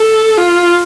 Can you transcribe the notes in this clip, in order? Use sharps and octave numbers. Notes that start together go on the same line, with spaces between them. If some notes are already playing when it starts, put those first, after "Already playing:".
Already playing: A4
F4